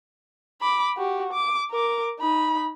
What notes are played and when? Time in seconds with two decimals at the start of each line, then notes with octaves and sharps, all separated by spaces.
0.61 B5 D6
0.97 F#4 G4
1.33 D6
1.70 A#4 D6
2.20 D#4 B5